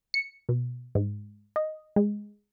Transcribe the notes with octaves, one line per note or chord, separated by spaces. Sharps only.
C#7
B2
G#2
D#5
G#3